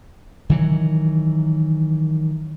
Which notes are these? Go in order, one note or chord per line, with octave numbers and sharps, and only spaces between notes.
D#3 E3 F#3